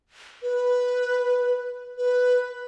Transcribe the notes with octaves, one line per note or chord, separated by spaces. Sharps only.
B4
B4